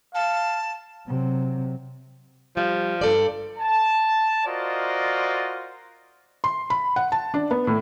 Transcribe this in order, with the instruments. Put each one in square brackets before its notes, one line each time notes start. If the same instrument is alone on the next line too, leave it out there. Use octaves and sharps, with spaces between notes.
[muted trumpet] F5 [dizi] A5
[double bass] C3 F#3
[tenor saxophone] F3 [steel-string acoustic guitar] G3
[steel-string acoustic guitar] G2 A4 D5
[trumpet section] A5
F4 F#4 A#4 C5 D5 D#5
[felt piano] C6
B5
F#5
A5
D4
B3
A2